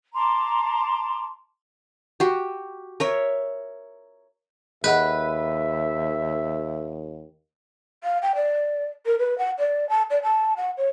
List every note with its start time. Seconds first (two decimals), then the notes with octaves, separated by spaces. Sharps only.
0.14 A5 A#5 C6 D6
2.20 F#4 G4
3.00 A#4 C#5 E5
4.84 D#2 G#4 B4 D#5 E5 F#5
8.04 F5
8.22 G5
8.36 D5
9.06 A#4
9.19 B4
9.38 F#5
9.58 D5
9.89 A5
10.10 D5
10.23 A5
10.57 F#5
10.77 C#5